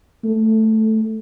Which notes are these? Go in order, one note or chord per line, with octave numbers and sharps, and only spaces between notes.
A3